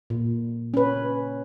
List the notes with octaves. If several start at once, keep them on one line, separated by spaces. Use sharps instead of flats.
A#2
C#4 B4